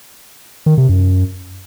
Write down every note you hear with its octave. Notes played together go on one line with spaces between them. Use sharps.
D#3
C3
F#2